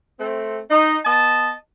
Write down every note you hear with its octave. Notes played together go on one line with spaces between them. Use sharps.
A3 C4
D#4
B3 D#5 A5